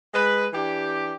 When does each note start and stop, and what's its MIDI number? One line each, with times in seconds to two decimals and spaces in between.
0.14 0.47 56
0.14 0.47 71
0.53 1.13 52
0.53 1.13 62
0.53 1.13 67